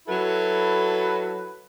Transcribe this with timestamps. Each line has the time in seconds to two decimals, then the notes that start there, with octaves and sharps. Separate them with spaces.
0.08 F#3 E4 F#4 A4 B4